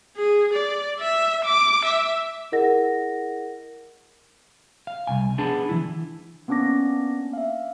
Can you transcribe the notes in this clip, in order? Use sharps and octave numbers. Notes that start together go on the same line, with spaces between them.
G#4
D5
E5
D6
E5
E4 G#4 A#4 D#5 F#5 A#6
F5
C2 G2 G#5
B3 D4 G#4 A5
E3 F3 E4
A#3 B3 C#4 D4 D6 A#6
E5 F5